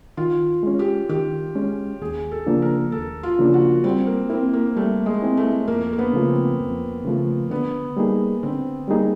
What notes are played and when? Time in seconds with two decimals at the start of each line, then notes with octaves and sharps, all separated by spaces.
0.17 D#3 F4
0.63 G#3 C#4
0.79 G4
1.09 D#3 G4
1.55 G#3 C#4
2.02 D#2 G#4
2.32 A4
2.46 C#3 F3 A#3 D4
2.62 A#4
2.92 D#2 A4
3.23 F4
3.39 C#3 F3 A#3 D4
3.54 F#4
3.84 G3 C4
4.07 A#3
4.30 A#3 C4 E4
4.53 A#3
4.76 G3 A3
5.06 G#3
5.22 C4 E4
5.37 A3
5.68 F2 A#3
5.93 A#3
5.99 B3
6.13 C#3 F3 A3
6.29 C4
6.59 F2
7.05 C#3 F3 A3
7.50 D3 B3
7.97 G3 A#3 D#4 G#4
8.43 D3 C4
8.88 G3 A#3 D#4 G#4